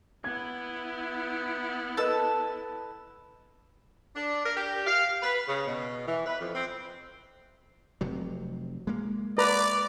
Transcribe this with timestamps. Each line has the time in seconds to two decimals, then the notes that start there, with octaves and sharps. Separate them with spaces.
0.24 B3 E4 G#6
1.97 A4 B4 D#5 A5 E6
4.16 D4
4.45 A#4
4.56 G4
4.87 F5
5.22 B4
5.47 C#3
5.66 B2
6.07 E3
6.26 B4
6.41 F2
6.54 C4
8.01 F1 C3 F#3
8.87 G#3 A#3
9.38 B4 D5 A#5